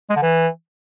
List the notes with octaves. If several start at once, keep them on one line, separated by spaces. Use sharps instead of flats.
G#3
D3
E3